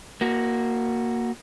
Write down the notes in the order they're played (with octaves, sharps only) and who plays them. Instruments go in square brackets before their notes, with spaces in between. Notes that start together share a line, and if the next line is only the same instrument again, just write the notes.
[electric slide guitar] A#3 F#4